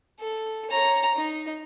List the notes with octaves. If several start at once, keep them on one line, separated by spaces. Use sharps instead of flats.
A4
C#5 A#5
D#4